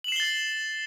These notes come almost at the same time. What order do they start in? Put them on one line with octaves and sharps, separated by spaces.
F#7 E7 C7 G7 A6